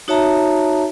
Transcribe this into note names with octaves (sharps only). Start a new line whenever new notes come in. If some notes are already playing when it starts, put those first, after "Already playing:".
D#4 F#4 C#5 E5 A5 A#5